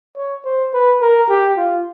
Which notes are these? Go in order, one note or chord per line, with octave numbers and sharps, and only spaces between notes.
C#5
C5
B4
A#4
G4
F4